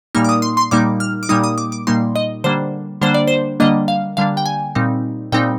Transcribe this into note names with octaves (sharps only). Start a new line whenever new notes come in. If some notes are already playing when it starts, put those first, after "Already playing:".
A#2 G3 A#3 D#4 F6
D6
D#6
C6
C6
A#2 G3 A#3 D#4 D6
F6
D6
A#2 G3 A#3 D#4 D#6
D#6
D6
D6
A#2 G3 A#3 D#4 C6
D#5
D3 G3 A#3 D4 C5
D3 G3 A#3 D4 C5
D5
C5
D3 G3 A#3 D4 D#5
F5
D3 G3 A#3 D4 F5
G5
G#5
A#2 G3 C4 D#4
A#2 G3 C4 D#4 G5